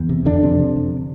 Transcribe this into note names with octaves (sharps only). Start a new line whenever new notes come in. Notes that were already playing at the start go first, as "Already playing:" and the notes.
Already playing: E2
C3
F2 D3 D4
C3
C3
F2